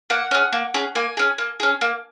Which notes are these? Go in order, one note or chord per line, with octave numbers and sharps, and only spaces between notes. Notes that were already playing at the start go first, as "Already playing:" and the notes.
A#3 F#5
C#4 G#4
A#3
C#4 G#4
A#3 G#5
C#4 G#4
A#3
C#4 G#4
A#3